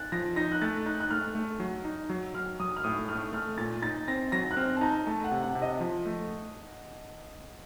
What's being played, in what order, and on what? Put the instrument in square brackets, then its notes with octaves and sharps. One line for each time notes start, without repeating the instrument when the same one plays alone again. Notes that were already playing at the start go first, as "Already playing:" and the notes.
Already playing: [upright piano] F#6 A6
[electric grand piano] F3 [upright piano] A#6
[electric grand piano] D#4 [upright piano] A#6
[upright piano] F#6
[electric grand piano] A3 [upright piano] A6
[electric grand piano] D#4 [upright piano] F#6
[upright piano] F#6
[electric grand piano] A3 [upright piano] F6
[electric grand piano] A3
F#3
D#4
F#3
[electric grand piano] F#3 [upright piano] F6
[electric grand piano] F#3 [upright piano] D#6
[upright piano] F6
[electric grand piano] A2 [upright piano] D#6
[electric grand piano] A3 [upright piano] F6
[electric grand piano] A3 [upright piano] F6
[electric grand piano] A#2 [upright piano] A6
[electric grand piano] D#4 [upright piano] A6
[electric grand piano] C4 [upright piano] A#6
[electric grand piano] F#3 [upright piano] A#6
[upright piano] F#6
[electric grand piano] C4 [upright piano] F6
[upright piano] A5
[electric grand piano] D#4 [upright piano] A#5
[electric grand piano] A3 [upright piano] A5
[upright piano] F#5
[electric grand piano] C3
[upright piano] F#5
[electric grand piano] C3
[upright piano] D#5
[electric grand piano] F3
A3